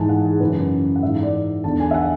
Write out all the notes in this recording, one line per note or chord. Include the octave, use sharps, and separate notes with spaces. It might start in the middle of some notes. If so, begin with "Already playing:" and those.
Already playing: G#2 E3 G#5 A5
F#5
G#4
F#2 C#3 E3 B4
F#5
G#2 E3 E5
D5
E2 D3 A5
G#5
E5
F#5